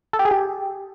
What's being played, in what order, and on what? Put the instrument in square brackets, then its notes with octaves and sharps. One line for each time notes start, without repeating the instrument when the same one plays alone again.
[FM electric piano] A4
G4
G#4
G4